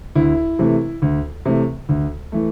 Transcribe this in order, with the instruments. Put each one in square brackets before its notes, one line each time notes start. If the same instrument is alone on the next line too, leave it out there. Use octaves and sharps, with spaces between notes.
[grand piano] D2 E4
C3 E3 A3
D2
C3 E3 A3
D2
E3 A3